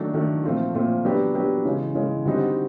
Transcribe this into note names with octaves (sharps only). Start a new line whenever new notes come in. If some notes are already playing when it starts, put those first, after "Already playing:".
Already playing: D#3 F#3 A3 D4
D#3 F#3 A3 D4
A#2 F3 A3 C4 F4
A#2 F3 A3 C4 F4
F#3 B3 D4 G4
F#3 B3 D4 G4
C#3 E3 G#3
C#3 E3 G#3
D3 G3 C4 D#4 F#4